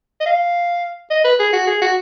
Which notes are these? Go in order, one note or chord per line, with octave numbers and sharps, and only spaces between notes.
D#5
F5
D#5
B4
G#4
F#4
G#4
F#4